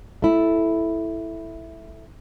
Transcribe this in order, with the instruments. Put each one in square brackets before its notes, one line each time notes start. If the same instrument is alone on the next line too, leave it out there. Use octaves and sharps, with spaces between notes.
[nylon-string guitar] A3 E4